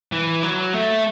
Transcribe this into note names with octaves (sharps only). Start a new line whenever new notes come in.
E3
F#3
A3